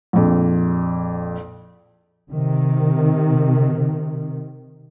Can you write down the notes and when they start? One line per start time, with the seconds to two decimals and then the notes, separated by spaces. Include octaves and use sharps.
0.13 A#1 F2
2.31 C3 D#3